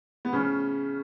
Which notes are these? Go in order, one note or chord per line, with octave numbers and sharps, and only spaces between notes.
B3
A2 C#3 F3 C#4